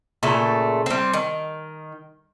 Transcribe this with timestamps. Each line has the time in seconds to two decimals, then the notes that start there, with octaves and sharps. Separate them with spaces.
0.23 A#2 C#3 A3
0.86 G3 C4
1.13 D#3